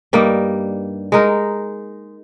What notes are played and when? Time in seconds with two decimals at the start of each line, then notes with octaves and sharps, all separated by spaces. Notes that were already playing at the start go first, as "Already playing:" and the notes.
0.13 G2 G3 A#3 D#4
1.12 G#3 D#4 A#4